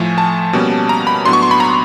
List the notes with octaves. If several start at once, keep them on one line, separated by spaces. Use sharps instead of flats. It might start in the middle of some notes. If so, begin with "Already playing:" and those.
Already playing: A2 F3 A3 G#5
A5
B2 G3 A#3 C#4
A#5
B5
A2 F#3 B3 D4 C6
C#6
C6
B5
A#5